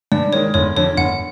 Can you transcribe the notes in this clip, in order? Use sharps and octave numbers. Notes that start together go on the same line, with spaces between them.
G2 D5
D#3 G#3 C#5
G1 C#5
F2 D3 C#5
G1 F#5